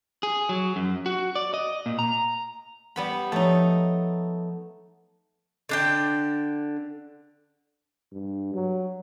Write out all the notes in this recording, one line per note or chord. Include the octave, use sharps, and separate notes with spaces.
G#4
F#3
F#2
F#4
D5
D#5
A#2
A#5
G3 B3 B5
F3 A3 D#4 C#5
D3 D4 G5
G2
F#3